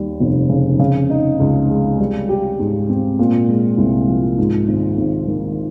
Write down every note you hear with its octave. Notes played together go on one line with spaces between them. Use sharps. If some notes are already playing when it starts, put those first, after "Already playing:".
Already playing: D#2 G3
F1
C#3
C#3
D#4
C#2
G#3
G3
G4
G#2
C4
A#2
G#3
C2
F3
G#2
G#1
G#1
D#3